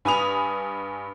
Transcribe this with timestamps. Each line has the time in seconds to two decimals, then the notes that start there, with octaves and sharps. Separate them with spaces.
0.05 G2 G#5 B5 D#6 F7